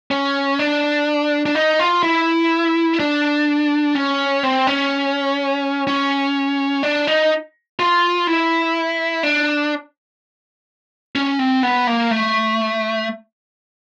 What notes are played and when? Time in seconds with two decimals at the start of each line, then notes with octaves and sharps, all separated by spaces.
0.11 C#4
0.59 D4
1.46 D4
1.55 D#4
1.79 F4
2.03 E4
3.00 D4
3.95 C#4
4.43 C4
4.67 C#4
5.87 C#4
6.83 D4
7.07 D#4
7.79 F4
8.27 E4
9.23 D4
11.15 C#4
11.39 C4
11.63 B3
11.87 A#3
12.11 A3